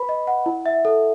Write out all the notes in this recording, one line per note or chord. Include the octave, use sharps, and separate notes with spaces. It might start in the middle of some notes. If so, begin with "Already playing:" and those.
Already playing: B4 B5
D#5
F#5
E4
E5
A4